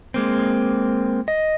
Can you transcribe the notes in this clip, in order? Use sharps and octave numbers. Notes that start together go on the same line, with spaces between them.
G#3 A#3 C4
D#5